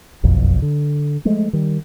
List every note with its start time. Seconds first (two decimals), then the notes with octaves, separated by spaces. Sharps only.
0.23 F#1 B1 F2
0.62 D3
1.25 F3 G#3 A3
1.53 D#3 G3